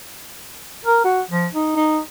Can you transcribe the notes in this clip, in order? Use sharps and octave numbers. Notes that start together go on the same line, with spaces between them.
A#4
F#4
F3
D#4
D#4